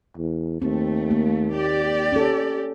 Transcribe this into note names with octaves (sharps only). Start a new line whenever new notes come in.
E2
D#2 A3 C4
A#3
G4 D5
C#4 A4